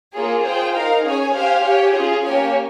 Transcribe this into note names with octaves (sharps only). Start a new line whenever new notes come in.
A#3 F4 G#4 C#5
F4 G#4 C5 G5
D#4 A#4 F5
C#4 G#4 C#5 G#5
G4 C5 F5 G#5
G4 C#5 G#5
C#4 F4 G#4
A#3 C#4 G4 C#5 G#5